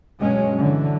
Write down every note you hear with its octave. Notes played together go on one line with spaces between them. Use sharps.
G2 B2 F#3 G#3 C#4
D3 E3 F#3